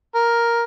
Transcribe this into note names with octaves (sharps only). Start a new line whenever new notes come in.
A#4